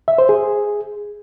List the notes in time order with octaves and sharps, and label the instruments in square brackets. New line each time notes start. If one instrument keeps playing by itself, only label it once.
[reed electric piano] E5
C5
G#4